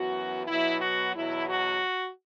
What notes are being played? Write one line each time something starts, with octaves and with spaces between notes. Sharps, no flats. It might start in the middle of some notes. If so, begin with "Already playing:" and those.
Already playing: F#2 E3 B3 F#4
B2 F#3 B3 E4
F#4
E2 B2 F#3 E4
F#4